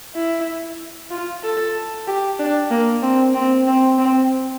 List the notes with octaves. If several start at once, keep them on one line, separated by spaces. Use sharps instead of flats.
E4
F4
A4
G4
D4
A#3
C4
C4
C4
C4